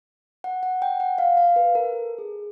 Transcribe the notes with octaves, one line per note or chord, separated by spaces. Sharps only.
F#5
F#5
G5
F#5
F5
F5
B4
A#4
A4
G#4